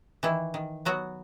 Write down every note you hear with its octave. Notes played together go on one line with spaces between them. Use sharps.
D#3 E3 E4
D#3
F#3 B3 F#4